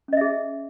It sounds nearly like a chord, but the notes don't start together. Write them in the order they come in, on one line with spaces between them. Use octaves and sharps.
C#4 D#5 E5 G#4